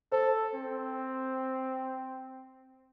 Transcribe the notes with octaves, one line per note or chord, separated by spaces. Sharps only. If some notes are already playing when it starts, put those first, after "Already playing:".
A4 C5
C4